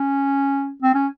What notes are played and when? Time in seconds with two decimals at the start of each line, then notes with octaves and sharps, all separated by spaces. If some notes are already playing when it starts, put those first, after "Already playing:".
Already playing: C#4
0.82 C4
0.94 C#4